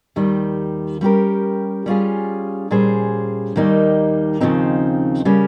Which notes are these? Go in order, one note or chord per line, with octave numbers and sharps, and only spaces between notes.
D#2 D#3 G3
G3 C#4 G4 A#4
G3 C#4 F4 G#4
A#2 G3 C#4 G#4 C5
D#2 D#3 G3 A#3 D#4
D#2 C#3 F3 C4 D#4
C#3 G3 A#3 C#4